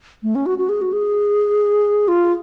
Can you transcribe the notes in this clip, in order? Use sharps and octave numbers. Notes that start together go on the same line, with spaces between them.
A3
C#4
F#4
F#4
G#4
F#4
G#4
F4